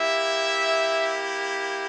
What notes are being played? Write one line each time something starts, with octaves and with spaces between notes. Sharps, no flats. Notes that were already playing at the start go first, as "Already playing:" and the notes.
Already playing: A#3 E4 G4 E5